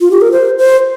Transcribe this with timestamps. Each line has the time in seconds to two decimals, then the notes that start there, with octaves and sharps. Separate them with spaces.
0.01 F4
0.11 G4
0.21 A#4
0.32 C5
0.58 C5